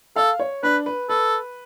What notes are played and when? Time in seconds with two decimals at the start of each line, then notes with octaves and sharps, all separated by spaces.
0.16 A4 F5
0.39 C#5
0.63 D4 B4
0.86 B4
1.09 A4 B4